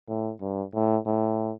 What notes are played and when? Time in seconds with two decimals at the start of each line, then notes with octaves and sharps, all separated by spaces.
0.09 A2
0.40 G2
0.74 A2
1.06 A2